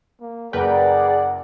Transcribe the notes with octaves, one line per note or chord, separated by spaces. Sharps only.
A#3
F#1 G#4 A#4 B4 D5 F#5 G5 A#5